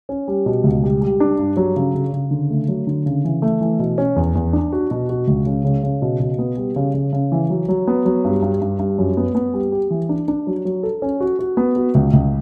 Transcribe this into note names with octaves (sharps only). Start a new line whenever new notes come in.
C#4
G3
B2
C#2
G3
G3
D4
G2
F#3
C#3
C#3
C#3
D3
A3
F#3
D3
C#3
E3
A3
E3
B2
C#4
E2
E2
D4
F#4
B2
F#4
C#2
C#3
C#3
C#3
B2
B2
B3
G3
C#3
C#3
C#3
E3
F#3
F#3
B3
F#3
G2
G2
G2
G2
F#2
B3
B3
G3
G4
E3
D4
D4
F#3
F#3
A4
C#4
F#4
F#4
B3
F#4
C#2
C#2